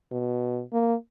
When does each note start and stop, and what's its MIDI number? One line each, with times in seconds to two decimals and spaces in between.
0.12 0.61 47
0.73 0.94 58